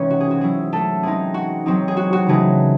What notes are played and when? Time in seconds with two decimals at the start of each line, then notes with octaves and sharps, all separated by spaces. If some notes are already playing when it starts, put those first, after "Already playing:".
Already playing: C3 E3 G#3 C4 C#4 D#4 C#5
0.10 F#4
0.21 G#4
0.31 F#4
0.41 F#3 C#4 E4 G#4
0.73 A3 A4
1.03 E3 G#3 C4 D#4 G#4
1.34 F#4
1.66 F#3 C4 D#4
1.88 G#4
1.97 F#4
2.13 F#4
2.27 C#3 E3 A3 D#4 G#4